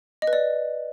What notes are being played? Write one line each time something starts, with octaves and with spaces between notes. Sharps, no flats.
D#5
B4
D5